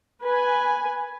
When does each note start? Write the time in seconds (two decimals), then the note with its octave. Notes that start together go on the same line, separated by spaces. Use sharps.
0.22 B4 G#5